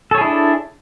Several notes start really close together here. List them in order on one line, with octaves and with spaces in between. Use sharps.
A4 C#5 G#4 E4 D4